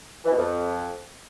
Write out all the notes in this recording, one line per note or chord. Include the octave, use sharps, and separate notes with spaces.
E3
B2
F2